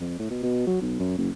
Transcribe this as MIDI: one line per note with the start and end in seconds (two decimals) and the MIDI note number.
0.01 0.18 41
0.19 0.28 45
0.30 0.42 47
0.43 0.65 47
0.67 0.77 54
0.81 0.95 35
1.00 1.15 42
1.18 1.30 30